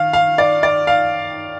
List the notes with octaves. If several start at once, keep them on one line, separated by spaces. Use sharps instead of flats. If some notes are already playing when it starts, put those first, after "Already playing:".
Already playing: D#3 F5
F5
D5
D5
F5